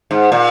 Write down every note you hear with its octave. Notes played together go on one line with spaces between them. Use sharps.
G#2
A#2